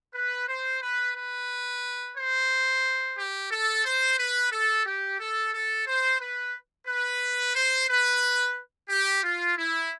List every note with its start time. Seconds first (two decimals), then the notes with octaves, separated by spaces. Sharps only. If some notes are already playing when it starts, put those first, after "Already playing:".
0.14 B4
0.48 C5
0.82 B4
1.16 B4
2.16 C5
3.17 G4
3.51 A4
3.85 C5
4.19 B4
4.52 A4
4.86 G4
5.20 A4
5.54 A4
5.87 C5
6.21 B4
6.87 B4
7.55 C5
7.89 B4
8.90 G4
9.23 F4
9.57 E4